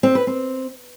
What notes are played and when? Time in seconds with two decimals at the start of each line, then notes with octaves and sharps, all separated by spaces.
0.03 C4
0.15 B4
0.27 C4